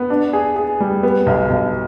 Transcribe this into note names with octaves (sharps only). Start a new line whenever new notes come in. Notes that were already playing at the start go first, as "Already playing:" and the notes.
Already playing: B3
D4
G#4
G#4
G3
B3
B1
B1